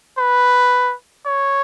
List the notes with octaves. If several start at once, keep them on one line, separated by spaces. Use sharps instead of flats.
B4
C#5